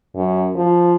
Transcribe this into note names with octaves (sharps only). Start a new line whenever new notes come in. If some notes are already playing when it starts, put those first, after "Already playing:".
F#2
F3